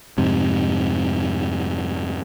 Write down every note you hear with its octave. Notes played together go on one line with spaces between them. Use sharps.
F2 G#2 C3